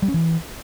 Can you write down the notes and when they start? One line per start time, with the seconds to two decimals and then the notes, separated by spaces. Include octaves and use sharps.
0.02 G3
0.08 C#4
0.14 E3